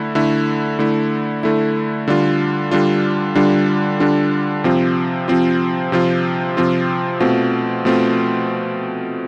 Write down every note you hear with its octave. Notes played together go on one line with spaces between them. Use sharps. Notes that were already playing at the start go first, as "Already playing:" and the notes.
Already playing: D3 A3 E4
D3 A3 E4
D3 A3 E4
D3 A3 E4
D3 G3 D4 F4
D3 G3 D4 F4
D3 G3 D4 F4
D3 G3 D4 F4
C3 F3 C4 F4
C3 F3 C4 F4
C3 F3 C4 F4
C3 F3 C4 F4
B2 A3 C4 F4
B2 A3 C4 F4